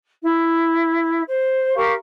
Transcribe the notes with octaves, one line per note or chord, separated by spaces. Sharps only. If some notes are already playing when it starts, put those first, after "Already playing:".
E4
C5
G4 A#4 F5 C#6